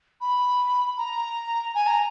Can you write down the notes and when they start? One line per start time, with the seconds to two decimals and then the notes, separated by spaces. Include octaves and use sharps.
0.21 B5
0.97 A#5
1.75 G#5
1.87 A#5